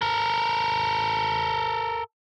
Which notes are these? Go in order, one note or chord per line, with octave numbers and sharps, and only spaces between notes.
A4 A#4